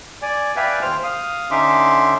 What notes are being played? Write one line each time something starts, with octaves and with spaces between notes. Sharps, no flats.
D5 G#5
B4 D5 E5 F5 G5 G#5
D#2 C5 F6
F5 D#6
D3 C#4 D#4 E5 C6 D6